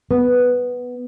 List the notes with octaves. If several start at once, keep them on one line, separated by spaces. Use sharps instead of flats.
B3